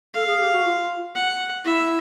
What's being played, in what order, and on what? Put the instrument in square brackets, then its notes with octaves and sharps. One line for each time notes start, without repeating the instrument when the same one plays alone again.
[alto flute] A4 [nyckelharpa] F5
[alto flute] G#4
G4
F#4
F4
[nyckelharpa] F#5
[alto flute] E4 [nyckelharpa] E5